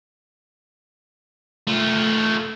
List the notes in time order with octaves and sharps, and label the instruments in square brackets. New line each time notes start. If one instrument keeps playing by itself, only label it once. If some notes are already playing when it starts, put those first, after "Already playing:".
[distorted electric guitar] A3 F4